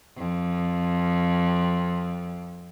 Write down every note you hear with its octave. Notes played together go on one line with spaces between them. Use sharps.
F2